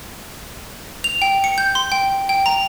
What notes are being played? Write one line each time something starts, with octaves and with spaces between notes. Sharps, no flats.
F7
G5
C#7
G6
C6
G5
G5
A#5